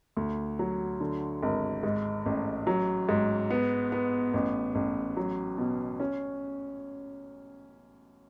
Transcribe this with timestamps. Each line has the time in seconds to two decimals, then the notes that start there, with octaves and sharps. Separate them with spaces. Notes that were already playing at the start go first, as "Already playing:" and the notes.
0.17 D2
0.59 F#3
1.00 D3
1.43 G#1
1.83 G#2
2.26 A1
2.67 F#3
3.09 G#2
3.50 B3
3.92 B3
4.34 A1
4.75 A1
5.17 F#3
5.58 B2
6.00 C#4